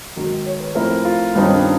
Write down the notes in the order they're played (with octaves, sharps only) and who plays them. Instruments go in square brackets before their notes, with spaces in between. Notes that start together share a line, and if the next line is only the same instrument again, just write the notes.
[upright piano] G#2 D#3 F#3
[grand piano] C#5
B4
[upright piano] A2 F3 A3 C4 E4 [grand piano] A#4
[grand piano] F4
[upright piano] G2 D#3 G3 C4 D#4
[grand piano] C#4
D4